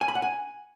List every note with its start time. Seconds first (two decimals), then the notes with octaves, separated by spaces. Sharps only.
0.01 G#5
0.08 B5
0.15 F#5
0.22 G#5